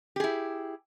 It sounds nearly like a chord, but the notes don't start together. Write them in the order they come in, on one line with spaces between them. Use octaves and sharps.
G4 G#4 E4